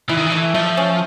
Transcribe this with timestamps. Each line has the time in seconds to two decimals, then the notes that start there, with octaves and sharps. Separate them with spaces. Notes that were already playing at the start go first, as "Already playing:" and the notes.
0.09 E3 E4
0.17 D#3
0.26 E3
0.32 A3
0.55 F3 A3
0.77 C#4